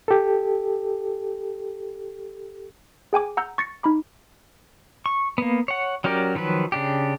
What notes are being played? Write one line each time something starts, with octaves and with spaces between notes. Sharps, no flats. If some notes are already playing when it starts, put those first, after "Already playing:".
G4 A4
G#4 G5 G#5 D6
F#5 A#5 E6 G6
C#6 A6 A#6 C#7
D#4 A#5 B5 D6
C#6
A#3 B3
C#5 F#5
F#3 C#4 G4 A#4 D5
D#3 F3 F#3 B4
C#3 D4 G4